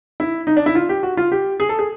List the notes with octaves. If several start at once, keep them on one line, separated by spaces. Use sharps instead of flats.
E4
D#4
D4
E4
F4
G4
F#4
F4
G4
G#4
A4
G#4